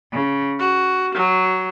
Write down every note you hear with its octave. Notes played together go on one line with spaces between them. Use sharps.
C#3
F#4
F#3